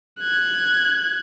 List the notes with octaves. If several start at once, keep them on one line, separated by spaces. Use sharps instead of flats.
F#6 G#6